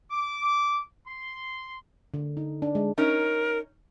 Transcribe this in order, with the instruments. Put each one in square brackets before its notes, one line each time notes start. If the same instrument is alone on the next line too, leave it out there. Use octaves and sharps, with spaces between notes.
[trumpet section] D6
C6
[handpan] D3
D#4
D4
G#3
[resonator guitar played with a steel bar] C#4 D#4 [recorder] A#4